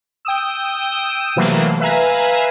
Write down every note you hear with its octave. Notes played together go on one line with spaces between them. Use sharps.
G5 D#6 E6
C3 E3 F#3 A3 A#3
B4 E5 F5 G#5 A#5